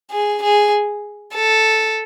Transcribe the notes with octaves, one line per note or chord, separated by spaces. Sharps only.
G#4
G#4
A4